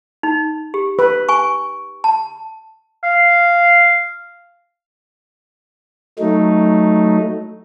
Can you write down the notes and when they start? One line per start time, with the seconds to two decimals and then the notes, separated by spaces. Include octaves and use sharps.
0.23 D#4
0.74 G4
0.99 B4
1.29 G#5 C#6
2.04 A5
3.04 F5
6.19 F#3 A3 D#4